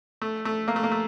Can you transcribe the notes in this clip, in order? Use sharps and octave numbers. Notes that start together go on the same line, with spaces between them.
A3
A3
A#3
A3
A#3
A3